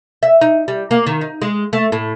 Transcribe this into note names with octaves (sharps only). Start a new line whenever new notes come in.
E5
D#4
G3
A#3
D#3
D#4
G#3
A3
A2